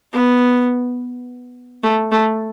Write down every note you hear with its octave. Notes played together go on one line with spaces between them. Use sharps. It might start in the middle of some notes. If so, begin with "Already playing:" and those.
B3
A3
A3